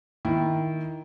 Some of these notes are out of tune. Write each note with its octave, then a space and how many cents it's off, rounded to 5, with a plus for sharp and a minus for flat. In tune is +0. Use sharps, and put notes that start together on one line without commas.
D#3 +10 E4 +0